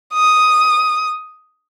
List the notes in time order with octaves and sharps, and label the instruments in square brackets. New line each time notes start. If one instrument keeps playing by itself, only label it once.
[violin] D#6